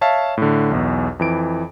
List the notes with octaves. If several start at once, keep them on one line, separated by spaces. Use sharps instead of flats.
C#5 E5 F5 A5
A2 D3
B1 E2
F2 E3 D7